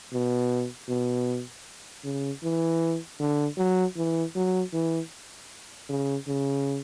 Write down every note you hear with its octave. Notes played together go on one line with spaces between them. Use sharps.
B2
B2
C#3
E3
D3
F#3
E3
F#3
E3
C#3
C#3